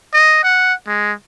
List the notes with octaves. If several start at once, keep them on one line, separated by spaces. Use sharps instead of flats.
D#5
F#5
G#3